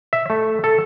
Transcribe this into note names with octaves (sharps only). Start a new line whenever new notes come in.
E5
A3
A4